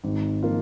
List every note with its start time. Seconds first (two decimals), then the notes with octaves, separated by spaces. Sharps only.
0.04 G#1
0.43 F3 A#3 F4